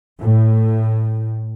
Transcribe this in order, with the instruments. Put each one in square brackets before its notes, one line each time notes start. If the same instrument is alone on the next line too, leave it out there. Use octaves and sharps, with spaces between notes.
[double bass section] A2